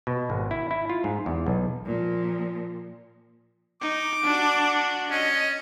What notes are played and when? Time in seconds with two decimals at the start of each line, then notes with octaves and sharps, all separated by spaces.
0.07 B2
0.30 G#1
0.51 E4
0.71 E4
0.90 F4
1.04 G#2
1.26 E2
1.46 B1
1.86 A#2 F3
3.81 D#4 D6
4.23 D4 F#4
5.11 C#4 D#5